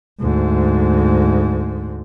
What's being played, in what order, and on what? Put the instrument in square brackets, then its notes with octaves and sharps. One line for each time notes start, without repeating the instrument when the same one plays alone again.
[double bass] D2 G#2